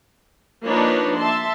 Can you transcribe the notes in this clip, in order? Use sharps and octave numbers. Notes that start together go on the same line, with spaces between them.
F3 A#3 D4 D#4 B4 C#5
E5 A5 C6